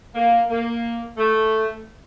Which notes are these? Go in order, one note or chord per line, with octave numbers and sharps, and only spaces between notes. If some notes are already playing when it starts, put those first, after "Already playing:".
A#3
A#3
A3